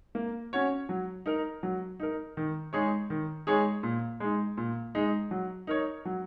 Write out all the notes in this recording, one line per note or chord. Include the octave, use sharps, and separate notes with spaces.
A#3
C#4 F#4 C#5
F#3
D#4 A#4
F#3
D#4 A#4
D#3
G#3 D#4 G#4 C#5
D#3
G#3 D#4 G#4 C#5
A#2
G#3 D#4
A#2
G#3 D#4
F#3
D#4 A#4 C#5
F#3